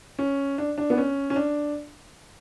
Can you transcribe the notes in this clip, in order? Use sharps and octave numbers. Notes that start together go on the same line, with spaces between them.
C#4
D4
D4
B3
C#4
C#4
D4